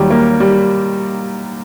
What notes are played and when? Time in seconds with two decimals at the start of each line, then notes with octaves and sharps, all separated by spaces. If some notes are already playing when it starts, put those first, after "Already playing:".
Already playing: D#2 F#3 G3 G4
0.10 A#3
0.40 G3